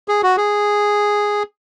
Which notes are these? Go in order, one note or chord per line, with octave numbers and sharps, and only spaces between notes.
G#4
F#4
G#4